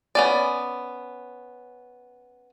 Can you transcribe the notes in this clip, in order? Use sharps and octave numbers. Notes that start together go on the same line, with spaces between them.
B3 C#4 D5